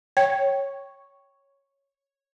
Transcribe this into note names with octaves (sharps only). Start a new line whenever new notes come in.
C#5 G5